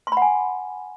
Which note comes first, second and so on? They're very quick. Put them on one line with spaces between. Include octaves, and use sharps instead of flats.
C6 B5 F#5 G#5